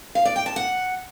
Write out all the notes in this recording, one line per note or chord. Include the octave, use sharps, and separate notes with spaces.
F5
D5
G5
A5
F#5